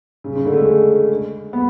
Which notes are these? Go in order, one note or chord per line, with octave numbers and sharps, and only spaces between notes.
C#3
C#3
D3
A3
G#3
B3